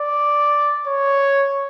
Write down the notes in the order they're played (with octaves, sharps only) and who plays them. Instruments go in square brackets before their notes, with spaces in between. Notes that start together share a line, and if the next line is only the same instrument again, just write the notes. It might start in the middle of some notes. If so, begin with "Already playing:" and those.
Already playing: [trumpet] D5
C#5